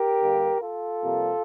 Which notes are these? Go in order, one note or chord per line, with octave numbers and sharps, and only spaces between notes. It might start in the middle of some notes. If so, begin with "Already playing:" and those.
Already playing: G4 A#4
G2 D3 G3 A#3
F4 A4
F2 C3 G3 A#3